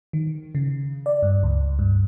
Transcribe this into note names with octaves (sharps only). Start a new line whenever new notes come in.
D#3
C#3
D5
G2
C#2
G2